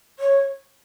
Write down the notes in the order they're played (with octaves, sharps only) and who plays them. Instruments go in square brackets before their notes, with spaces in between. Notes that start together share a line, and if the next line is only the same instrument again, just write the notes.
[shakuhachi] C#5